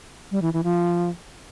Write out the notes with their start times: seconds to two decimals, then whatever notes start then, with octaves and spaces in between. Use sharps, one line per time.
0.31 G3
0.42 E3
0.53 E3
0.64 F3